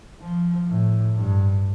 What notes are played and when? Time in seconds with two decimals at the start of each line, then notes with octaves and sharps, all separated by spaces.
0.21 F3
0.68 A2
1.16 G2